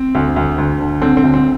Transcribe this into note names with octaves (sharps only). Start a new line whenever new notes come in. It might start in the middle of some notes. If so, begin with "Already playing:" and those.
Already playing: C4
D2
D2
D2
D3
D3 C4
C4
D2
C4